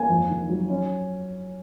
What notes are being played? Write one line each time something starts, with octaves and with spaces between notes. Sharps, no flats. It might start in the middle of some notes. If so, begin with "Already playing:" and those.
Already playing: A#3 G#5
F2
D#3
F#3
C#4